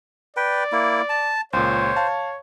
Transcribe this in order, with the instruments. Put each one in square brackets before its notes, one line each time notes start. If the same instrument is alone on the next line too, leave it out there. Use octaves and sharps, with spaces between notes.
[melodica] B4 G5 [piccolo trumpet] D5
[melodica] A#3 E4
A5
[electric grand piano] C#2 A#2 [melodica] C5 [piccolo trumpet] C#5
[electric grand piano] F5 A5